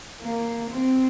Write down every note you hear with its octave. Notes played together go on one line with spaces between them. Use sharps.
A#3
C4